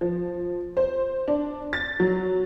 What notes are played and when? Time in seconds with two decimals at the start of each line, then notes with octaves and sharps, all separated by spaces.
0.01 F3
0.77 C5
1.28 D4
1.73 A6
2.00 F#3